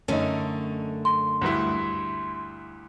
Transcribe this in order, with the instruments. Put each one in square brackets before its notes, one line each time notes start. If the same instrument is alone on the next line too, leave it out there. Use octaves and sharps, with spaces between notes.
[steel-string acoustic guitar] F#2 D3 A3 [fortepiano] C#4 D#4
[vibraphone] C6
[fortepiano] D2 G2 E4